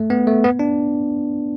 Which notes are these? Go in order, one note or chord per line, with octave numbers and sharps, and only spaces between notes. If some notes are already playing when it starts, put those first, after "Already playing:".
Already playing: A3
B3
A3
B3
D4